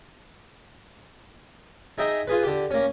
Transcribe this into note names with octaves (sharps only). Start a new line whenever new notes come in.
D#4 G#4 E5 G5 A#5
F4 G#4 B4
D3 G4
A#3 C#4